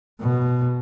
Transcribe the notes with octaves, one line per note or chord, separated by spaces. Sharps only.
B2